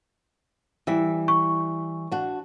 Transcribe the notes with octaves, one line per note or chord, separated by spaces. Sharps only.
E3 G3 E5
C#6
D4 F#4